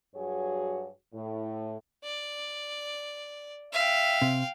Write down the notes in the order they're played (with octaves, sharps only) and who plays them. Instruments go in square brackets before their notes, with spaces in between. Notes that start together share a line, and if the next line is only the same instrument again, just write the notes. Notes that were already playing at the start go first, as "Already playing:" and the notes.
[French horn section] G2 F#3 F#4 G#4 C#5
A2
[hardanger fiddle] D5
[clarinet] E5 [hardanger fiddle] F5 G5
[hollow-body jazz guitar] C3